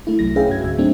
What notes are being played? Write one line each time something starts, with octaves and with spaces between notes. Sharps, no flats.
A3 E4
C2 F#3 A#6
C#4 G#4 B4 E5 F5 G5
G2 F#4 G#6
D2 G#2 E5
F#3 A3 C4 D4 D#4